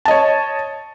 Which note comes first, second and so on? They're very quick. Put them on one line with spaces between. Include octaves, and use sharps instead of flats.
A5 D#5 C#5